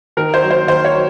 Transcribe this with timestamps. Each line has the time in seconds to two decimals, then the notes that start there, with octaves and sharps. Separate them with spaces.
0.17 D#3 A#4
0.34 C5
0.42 F#3
0.51 C5
0.67 D#3 C5
0.84 C#5
0.93 F#3